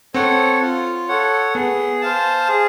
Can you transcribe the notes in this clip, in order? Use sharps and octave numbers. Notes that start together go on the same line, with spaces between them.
C4 A4 C#5 F#5
F4
A4 C#5 F#5
B3 G#4
C5 F5 A5
G#4